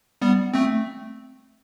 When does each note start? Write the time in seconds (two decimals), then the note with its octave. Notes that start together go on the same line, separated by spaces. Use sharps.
0.22 G3 B3
0.54 A3 C4